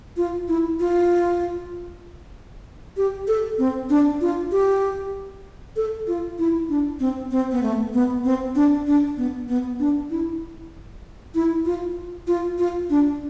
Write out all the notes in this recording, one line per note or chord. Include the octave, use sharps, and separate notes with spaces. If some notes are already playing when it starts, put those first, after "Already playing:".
F4
E4
F4
G4
A4
C4
D4
F4
G4
A4
F4
E4
D4
C4
C4
B3
A3
B3
C4
D4
D4
B3
B3
D4
E4
E4
F4
F4
F4
D4